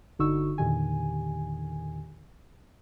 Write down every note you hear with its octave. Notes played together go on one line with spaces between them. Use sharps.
G1 D3 D#4 F#4 C#6 E6
E2 A#2 D3 D#3 G4 G#5